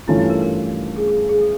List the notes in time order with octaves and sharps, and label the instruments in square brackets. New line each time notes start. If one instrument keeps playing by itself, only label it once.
[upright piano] G2 E3 A3 C#4 F4 [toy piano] E4
[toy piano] E4
A#4
A#4
G#4
G#4
G#4
A4